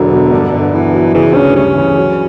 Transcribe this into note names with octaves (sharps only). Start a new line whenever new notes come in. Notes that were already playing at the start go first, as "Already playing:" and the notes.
Already playing: E1 E2 D3 F#3
B2
G2
G1
E3 B3
F#3
C#3 E3
D2 C#4
G3 C#4
E3
F#3